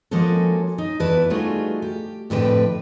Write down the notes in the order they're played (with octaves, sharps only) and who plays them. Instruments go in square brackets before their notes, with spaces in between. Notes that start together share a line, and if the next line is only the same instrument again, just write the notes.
[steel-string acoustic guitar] F3 G#3 A#3 C#4 F#4 A4
D#4
E2 E4 B4 D5 A5
G3 A3 D#4 F4 F#4 G#4
G4
F2 A2 D3 B4 G5